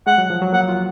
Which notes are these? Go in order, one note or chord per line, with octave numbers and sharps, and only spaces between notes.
G#3 F#5
F#3
F3
F#3
A#3 F#5
F4